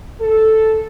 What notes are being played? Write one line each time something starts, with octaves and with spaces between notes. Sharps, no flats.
A4